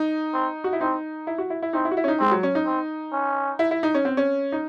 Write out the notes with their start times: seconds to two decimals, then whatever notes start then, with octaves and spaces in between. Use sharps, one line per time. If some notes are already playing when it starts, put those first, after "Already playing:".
Already playing: D#4
0.34 C4
0.64 F#4
0.73 E4
0.81 C4 D#4
1.27 E4
1.38 F#4
1.50 E4
1.62 E4
1.73 C4 D#4
1.85 E4
1.91 F#4
1.97 E4
2.04 C#4
2.08 D#4
2.20 G#3 C4
2.32 F#3
2.43 C#4
2.55 D#4
2.66 C4
3.13 C#4
3.59 E4
3.71 E4
3.83 D#4
3.94 C#4
4.05 C4
4.17 C#4
4.52 D#4